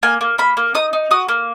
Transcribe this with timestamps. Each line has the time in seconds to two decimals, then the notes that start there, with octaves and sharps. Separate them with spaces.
0.03 A#3 G#5
0.21 A#3
0.38 A#3 B5
0.57 A#3
0.75 D#4 D#6
0.93 D#4
1.11 F#4 D#6
1.29 A#3